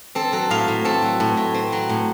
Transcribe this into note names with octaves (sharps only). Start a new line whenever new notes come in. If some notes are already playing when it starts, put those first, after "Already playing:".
C4 A4
F#3 A4
A2 F5
A2
C4 A4
F#3
A2
A2
C4
F#3
A2